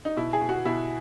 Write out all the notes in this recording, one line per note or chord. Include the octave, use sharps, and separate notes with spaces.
D#4
B2 E4
G#4
B2
F#4
B2 E4